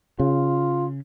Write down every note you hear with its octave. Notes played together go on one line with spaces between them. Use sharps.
C#3 F4